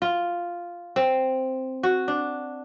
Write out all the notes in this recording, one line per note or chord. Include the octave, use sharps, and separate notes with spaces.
F4
C4
F#4
D4